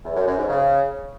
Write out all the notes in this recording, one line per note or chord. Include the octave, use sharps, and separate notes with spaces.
E2
F#2
F#2
G#2
C#3